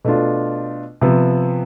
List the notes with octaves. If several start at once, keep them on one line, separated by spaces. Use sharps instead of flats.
B2 A3 D4 F4
C3 F3 B3